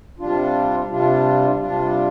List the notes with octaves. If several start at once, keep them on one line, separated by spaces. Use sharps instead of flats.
C3 G3 D4 F4
C3 G3 D4 F4
C3 G3 D4 F4